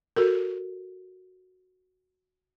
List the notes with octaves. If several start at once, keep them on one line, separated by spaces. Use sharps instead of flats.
F#4 A4 A#4